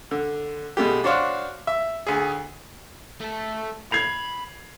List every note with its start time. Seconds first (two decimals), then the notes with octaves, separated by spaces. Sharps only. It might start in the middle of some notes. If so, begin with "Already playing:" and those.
0.11 D3
0.77 B2 G#3 A3 G4
1.04 D4 F#4 C5 C#5 F5 D6
1.67 E5
2.07 D2 G#4
3.21 A3 A4
3.92 B5 G#6 C7 F7